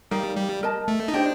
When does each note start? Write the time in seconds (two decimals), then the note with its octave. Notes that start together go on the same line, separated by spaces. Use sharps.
0.11 G3 D#4 A#4 F5
0.37 G3
0.63 A#4 D#5 A5
0.88 A3
1.08 D#4
1.14 D4 G4 C5 D#5 G5